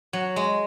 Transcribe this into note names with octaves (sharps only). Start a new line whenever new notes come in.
F#3
G#3